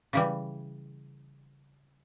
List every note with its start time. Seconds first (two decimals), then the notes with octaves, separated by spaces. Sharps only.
0.13 C#3 E3 G3